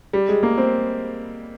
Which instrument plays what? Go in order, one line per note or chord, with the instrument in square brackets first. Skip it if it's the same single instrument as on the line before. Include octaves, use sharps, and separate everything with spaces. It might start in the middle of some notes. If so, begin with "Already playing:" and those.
[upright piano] G3
G#3
A#3
C4